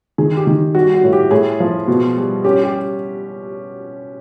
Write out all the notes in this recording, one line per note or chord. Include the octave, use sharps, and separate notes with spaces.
D#3 G#4
G4
D#3
G3 F#4
F#4
A2
G4
A2 G#4
F3
B2
G3
C#4 G4
G4